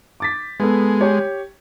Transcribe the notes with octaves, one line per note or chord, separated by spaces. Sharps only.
D6 A6 B6
G#3 B3 A4
G4 C#5